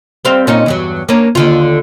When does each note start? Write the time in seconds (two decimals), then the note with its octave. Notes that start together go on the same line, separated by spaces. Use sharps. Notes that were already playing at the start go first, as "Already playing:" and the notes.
0.25 G3 C4 F5
0.47 A#2 C#4 D#4
0.66 E2 G2 F#3
1.09 A#3 C#4 D4
1.35 D#2 D3 F4